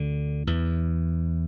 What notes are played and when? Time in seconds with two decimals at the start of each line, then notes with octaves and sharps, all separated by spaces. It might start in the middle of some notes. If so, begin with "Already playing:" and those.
Already playing: D2 D3
0.47 E2 E3